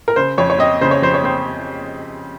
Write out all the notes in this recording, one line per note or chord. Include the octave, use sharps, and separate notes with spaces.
A#4
C#3 C5
F2 C#5
C#5
C4 D#5
C#3 C5
C#5
F2 C5
C#5
C4 C5